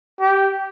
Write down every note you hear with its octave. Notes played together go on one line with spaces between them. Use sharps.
G4